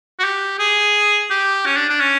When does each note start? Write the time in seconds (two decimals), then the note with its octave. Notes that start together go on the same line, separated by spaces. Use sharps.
0.19 F#4
0.24 G4
0.59 G#4
1.31 G4
1.66 C#4
1.76 D4
1.89 D4
2.00 C#4